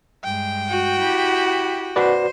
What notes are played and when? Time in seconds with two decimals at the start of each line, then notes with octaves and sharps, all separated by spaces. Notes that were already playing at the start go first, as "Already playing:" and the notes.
0.24 G2 G#3 G5
0.69 F#4
0.99 E4 G4
1.96 F#4 B4 C5 D5